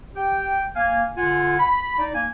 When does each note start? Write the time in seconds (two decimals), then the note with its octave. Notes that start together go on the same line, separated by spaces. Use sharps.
0.15 G4 G5
0.76 A#3 F5 G#5
1.17 D3 F4 F#5 G#5
1.59 B5
1.99 D#4 D5
2.14 A#3 G#5